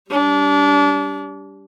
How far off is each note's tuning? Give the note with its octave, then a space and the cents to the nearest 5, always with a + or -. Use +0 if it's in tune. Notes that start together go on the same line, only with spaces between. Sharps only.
G3 +0 D4 -30